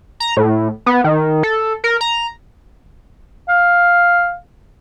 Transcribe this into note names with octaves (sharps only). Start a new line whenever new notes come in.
A#5
A2
B3
D#3
A4
A#4
A#5
F5